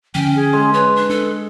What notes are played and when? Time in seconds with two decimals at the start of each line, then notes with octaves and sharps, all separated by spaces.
0.15 D3 F3 C#4 G5
0.36 G#4
0.53 G#3
0.74 B4 C#5
0.96 D4
1.09 D4 A4